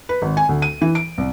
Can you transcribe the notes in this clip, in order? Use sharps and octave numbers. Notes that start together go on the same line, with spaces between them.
B4
G#1
G#5
D2
D#7
E3
D7
C2